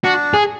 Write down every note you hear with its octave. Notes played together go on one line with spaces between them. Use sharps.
D4 F#4
G#4